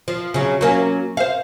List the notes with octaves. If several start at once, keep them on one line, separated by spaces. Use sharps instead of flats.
F3
C#3 F#3
F#3 A#3 C#4
C5 F5